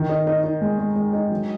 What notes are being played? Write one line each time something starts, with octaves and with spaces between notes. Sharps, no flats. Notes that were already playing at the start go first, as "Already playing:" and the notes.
Already playing: D#3
D#4
D#4
D#4
G#3
G#3
G#3
D#4
F#3